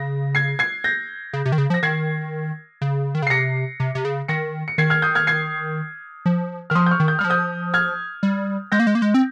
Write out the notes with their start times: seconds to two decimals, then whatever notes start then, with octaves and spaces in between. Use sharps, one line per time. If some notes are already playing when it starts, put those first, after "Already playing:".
Already playing: C#3 A#6
0.35 G#6 C7
0.59 G#6 C7
0.84 G6 A#6
1.33 C#3
1.45 C3
1.52 D#3
1.58 C#3
1.70 F3
1.74 A#6
1.83 D#3 G#6 C7
2.81 C#3
3.15 D#3
3.22 C#3
3.27 C7
3.30 C3 A#6 C#7
3.80 C3
3.95 C3
4.05 C#3
4.28 D#3 A#6 C#7
4.68 C#7
4.78 D#3 G#6 C7
4.90 F6 G#6
5.02 D#6 G6
5.15 F6 G#6
5.27 G#6 C7
6.26 F3
6.70 D#3 F6
6.75 F3 C6 D#6
6.86 G6
6.91 C#6 F6
7.00 D#3
7.08 G6
7.19 G3 F6
7.24 F3
7.30 D#6 G6
7.74 F6 G#6
8.23 G3
8.72 G#3 G6 A#6
8.80 A#3
8.87 G#3
8.95 A#3
9.02 G#3
9.14 C4